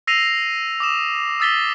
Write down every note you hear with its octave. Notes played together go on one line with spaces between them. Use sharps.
E6 A#6 C7 D#7 F7
D6 D#6 E7
D#6 E6 A6 B6 G7